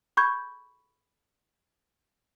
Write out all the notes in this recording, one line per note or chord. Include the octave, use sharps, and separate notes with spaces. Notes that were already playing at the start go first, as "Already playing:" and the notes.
B5 C#6 G6 G#6